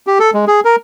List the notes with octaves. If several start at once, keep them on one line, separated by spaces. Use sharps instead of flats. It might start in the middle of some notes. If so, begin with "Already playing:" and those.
G4
A4
G#3
G#4
A#4